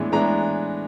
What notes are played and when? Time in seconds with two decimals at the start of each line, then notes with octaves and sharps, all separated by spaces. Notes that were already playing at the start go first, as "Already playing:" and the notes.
Already playing: A2 E3 G#3 B3 D4
0.12 A2 E3 G#3 B3 D4 A#5